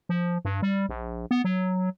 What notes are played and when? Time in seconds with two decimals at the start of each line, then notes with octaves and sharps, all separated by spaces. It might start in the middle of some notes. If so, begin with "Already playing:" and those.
0.09 F3
0.45 G2
0.62 G3
0.89 A#1
1.31 B3
1.44 F#3